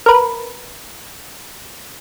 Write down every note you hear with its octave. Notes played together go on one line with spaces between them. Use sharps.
A#4 B4